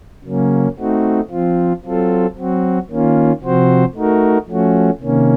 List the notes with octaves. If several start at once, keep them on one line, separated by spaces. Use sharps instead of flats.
C#3 F#3 A#3 C#4
A3 C4 D#4 F#4
F3 C4 F4
F#3 C4 F4 A4
F#3 C4 F#4
D#3 A#3 C#4 F4
C3 F3 C4 F#4 C5
A3 D#4 F#4 A#4
F3 A3 C#4 F#4
C3 D#3 A#3 C#4